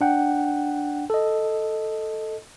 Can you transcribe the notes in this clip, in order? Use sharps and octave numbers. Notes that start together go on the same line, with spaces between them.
D4 F#5 G5
A4 D#5